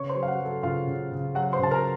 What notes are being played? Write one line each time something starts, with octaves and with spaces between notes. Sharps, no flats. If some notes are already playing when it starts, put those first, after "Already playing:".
Already playing: C#3 C#5 C#6
C5 C6
F#3
F5
F#4 F#5
F#3 A4
C#3 F4 F5
C#3
C#3
F#3 F#4 F#5
C5 C6
C#3 A5
A#4 A#5